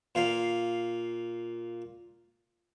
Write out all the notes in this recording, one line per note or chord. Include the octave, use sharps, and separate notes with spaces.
A#2 F5